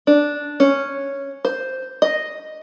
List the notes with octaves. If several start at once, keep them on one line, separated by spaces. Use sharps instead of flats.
D4
C#4
C5
D#5